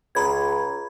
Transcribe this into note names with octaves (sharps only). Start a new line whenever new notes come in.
C#2 A#5 B5 G#6